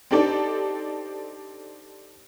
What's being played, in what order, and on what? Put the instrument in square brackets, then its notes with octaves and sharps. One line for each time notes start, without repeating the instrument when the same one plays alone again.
[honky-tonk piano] C4 D4 D#4 G4 A4 D5